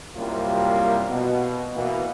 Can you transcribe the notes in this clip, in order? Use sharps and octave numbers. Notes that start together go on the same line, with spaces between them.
C2 F#2 C3 G3 A#3 F4
B2
B2 E3 A#3